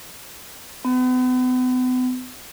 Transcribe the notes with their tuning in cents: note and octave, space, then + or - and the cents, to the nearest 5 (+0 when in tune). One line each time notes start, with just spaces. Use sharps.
B3 +40